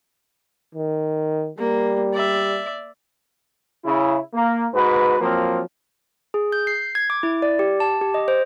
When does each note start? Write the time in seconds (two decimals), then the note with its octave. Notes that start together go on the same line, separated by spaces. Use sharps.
0.75 D#3
1.58 G3 A#3
2.14 D5 E5
3.85 C#3 E4
4.33 A#3
4.73 G#2 F#4 B4
5.20 F3 F#3 A#3 C4
6.34 G#4
6.52 G6
6.67 C7
6.95 G#6
7.10 D6
7.23 E4
7.42 D5
7.59 G4
7.80 A5
8.01 G4
8.14 D#5
8.28 C5